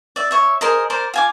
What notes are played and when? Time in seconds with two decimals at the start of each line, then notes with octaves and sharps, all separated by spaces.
0.16 D5 E5
0.31 C#5 E5
0.61 G#4 A#4 C5 D#5
0.90 A#4 C5 D5
1.14 F4 G#5 D6